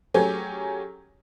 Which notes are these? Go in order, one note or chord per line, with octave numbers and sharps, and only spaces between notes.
F#3 A3 C#4 G4 G#4